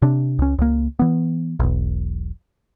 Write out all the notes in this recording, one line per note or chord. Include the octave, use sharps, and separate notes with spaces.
C3 D4
C#2 C#4
C#2 A#3
E3 B3
E1 B1